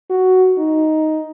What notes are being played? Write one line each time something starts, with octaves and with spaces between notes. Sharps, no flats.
F#4
D#4